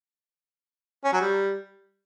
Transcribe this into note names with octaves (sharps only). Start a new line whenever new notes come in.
C#4
F#3
G3